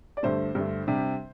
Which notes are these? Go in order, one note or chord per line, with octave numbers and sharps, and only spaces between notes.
D5
G2 D3 A3 C5
G2 D3 A3
C3 G3 D4